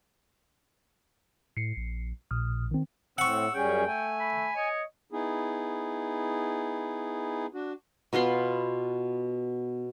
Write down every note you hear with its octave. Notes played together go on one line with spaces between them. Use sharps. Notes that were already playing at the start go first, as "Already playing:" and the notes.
A2 C7 C#7
A#1
A#1 A#2 D#6 F6
D#3 C4
A2 C4 F#5 C#6 E6
F#2 G3 C#4 G#4 G5
A3 G#5
B5
C#5 D#5
B3 D#4 E4 G#4
D4 F#4
B2 B3 F4 C6